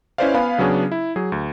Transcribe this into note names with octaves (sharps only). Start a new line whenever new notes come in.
C#4 E4 B4 C5 D5 F5
B3 B4 F5 G#5 B5
C#3 F#3 B3 C#4 D4 G#4
E4
F#3 G#4
D2